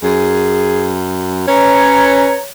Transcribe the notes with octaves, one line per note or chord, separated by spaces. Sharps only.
F#2 G#4
C#4 B4 C#5 A#5